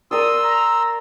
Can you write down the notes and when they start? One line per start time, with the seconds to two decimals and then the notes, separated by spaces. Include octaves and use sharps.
0.11 A#4 D5 C6 D#6 E6
0.43 A#5